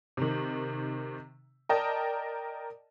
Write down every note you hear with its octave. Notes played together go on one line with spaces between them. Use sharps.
C3 D#3
A#4 D5 D#5 G5 A5